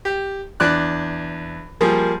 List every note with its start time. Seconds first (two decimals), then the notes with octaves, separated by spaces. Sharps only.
0.05 G4
0.60 E2 D4 D5 F#6
1.81 F3 G3 A#3 G#4